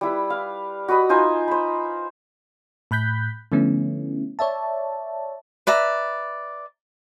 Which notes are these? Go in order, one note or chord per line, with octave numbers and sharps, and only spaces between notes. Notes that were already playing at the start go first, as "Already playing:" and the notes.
G3 E4 B4
F5
F#4 B4 D#5 B5
D#4 F4 C5 G#5
C5 B5
A2 B5 F#6 G6 B6
D3 F3 A3 B3 C#4 E4
C#5 D5 E5 A5
B4 D5 E5 A#5